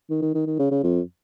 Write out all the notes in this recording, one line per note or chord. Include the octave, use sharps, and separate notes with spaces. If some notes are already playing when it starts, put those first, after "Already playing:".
D#3
D#3
D#3
D#3
C#3
C#3
F2